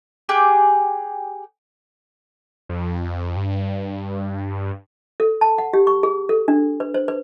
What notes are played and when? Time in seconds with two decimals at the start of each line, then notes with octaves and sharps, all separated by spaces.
0.29 G4 G#4 G5 F#6
2.69 F2
3.36 G2
5.20 A4
5.41 A5
5.58 F#5
5.73 G4
5.87 C#6
6.03 G#4
6.29 A4
6.48 D4
6.80 B4
6.94 C5
7.08 B4